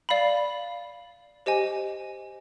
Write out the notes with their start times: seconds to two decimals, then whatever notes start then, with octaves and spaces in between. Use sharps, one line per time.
0.09 D5 F5 B5
1.46 G4 C5 D#5 G#5